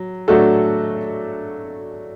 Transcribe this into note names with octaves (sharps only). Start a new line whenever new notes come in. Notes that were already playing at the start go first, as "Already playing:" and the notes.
Already playing: F#3
F#3 A3 D4 F#4 A4